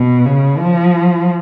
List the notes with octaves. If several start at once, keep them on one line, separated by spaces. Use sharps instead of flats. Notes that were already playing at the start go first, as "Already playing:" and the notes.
Already playing: B2
C#3
F3